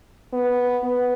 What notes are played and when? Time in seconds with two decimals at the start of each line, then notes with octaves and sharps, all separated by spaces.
0.33 B3
0.84 B3